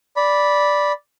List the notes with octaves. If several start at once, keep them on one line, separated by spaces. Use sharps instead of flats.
D5 B5